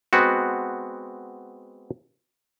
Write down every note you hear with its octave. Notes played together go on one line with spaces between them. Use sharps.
G#3 B3 C4 F#4